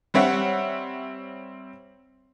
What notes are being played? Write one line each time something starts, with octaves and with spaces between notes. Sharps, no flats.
G3 C4 C#5 E5 F#5